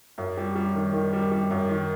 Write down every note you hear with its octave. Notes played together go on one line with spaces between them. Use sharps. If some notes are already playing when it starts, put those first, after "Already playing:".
F#2
G3
G3
D#3
D#3
G3
G3
F#2
D#3